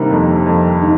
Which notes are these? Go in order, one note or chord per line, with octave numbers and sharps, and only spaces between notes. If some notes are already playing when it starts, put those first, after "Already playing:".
Already playing: G1 C3 D#3 G3 A#3 C4 D4
F2
F2
D#3